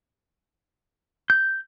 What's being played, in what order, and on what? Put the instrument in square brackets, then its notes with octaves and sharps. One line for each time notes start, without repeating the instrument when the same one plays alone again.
[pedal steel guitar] G6